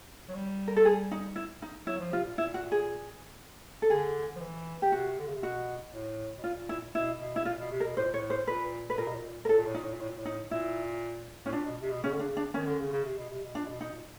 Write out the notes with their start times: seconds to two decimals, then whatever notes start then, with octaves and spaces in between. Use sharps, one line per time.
0.28 F#3
0.35 G3
0.68 A#4
0.76 A4
0.85 G#4
1.11 D#4
1.36 E4
1.62 D#4
1.87 F#3 E4
2.00 F3
2.12 C3 F4
2.25 A#2
2.38 E4
2.54 F#4
2.72 G#4
3.82 A4
3.90 D3 G#4
4.36 F3
4.41 E3
4.82 G4
4.91 C3 F#4
5.19 D3
5.27 C#3
5.35 C3
5.43 B2 F#4
5.94 A2
6.38 B2
6.44 A#2 F4
6.69 E4
6.95 B2 E4
7.20 B2
7.36 E4
7.45 A#2 F4
7.59 B2
7.71 C3
7.80 A#4
7.84 B2
7.97 A2 C5
8.04 A#2
8.13 A2 C#5
8.30 C5
8.47 A#2 B4
8.90 B4
8.98 A#2 A#4
9.07 B2
9.15 A#2
9.45 A#4
9.49 A2 A4
9.57 A#2
9.66 A2
9.74 A#2 D#4
9.84 A2
9.92 A#2
10.00 A2
10.09 A#2
10.18 A2
10.25 D#4
10.51 A#2 E4
11.46 A2 C#4
11.52 A#2 D4
11.65 B2
11.82 C3
11.90 B2
12.03 C#3 C#4
12.13 D3
12.19 C#3 D4
12.37 D4
12.54 D#3 C#4
12.67 D3
12.80 C#3
12.92 C#3
13.04 C3
13.17 B2
13.30 C3
13.43 B2
13.55 A#2 D4
13.68 B2
13.80 B2 D#4
13.93 A#2